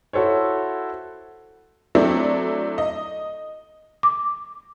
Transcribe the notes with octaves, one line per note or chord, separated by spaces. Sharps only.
E4 F#4 A4 C5 C#5
F#3 A3 C4 D4 E4
D#5
D6